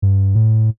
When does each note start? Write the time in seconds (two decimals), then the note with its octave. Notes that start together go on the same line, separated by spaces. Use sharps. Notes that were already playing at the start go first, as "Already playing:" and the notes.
0.02 G2
0.35 A2